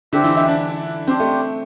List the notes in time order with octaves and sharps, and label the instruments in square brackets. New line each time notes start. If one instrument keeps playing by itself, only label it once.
[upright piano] D3 [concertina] C4 G4 E5
[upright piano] E3
E4
D4
[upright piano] C4 [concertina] D4 G4 C5
[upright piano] A3